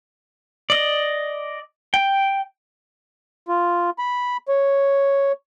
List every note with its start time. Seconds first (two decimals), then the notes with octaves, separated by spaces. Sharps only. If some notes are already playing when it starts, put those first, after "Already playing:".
0.70 D5 D#5
1.94 G5
3.48 F4
3.99 B5
4.48 C#5